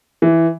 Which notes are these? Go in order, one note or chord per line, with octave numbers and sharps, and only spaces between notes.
E3